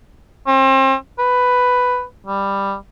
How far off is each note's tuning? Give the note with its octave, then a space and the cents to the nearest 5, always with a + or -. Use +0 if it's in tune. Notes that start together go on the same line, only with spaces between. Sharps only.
C4 +35
B4 +5
G3 +10